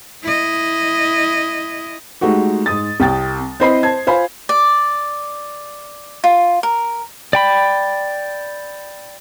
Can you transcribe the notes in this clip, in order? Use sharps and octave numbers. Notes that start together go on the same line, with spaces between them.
E4 D#5
G#3 A3 D#4 F#4 G4
G#2 D#6 A6
C2 G5 A6
C4 E4 C5 D#5 B5 C7
C5 A5 G#6
F4 C5 F5 G#5 B5
D5
F4
A#4
D5 G5 B5